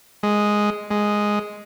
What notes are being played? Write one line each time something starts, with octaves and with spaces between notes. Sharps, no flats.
G#3
G#3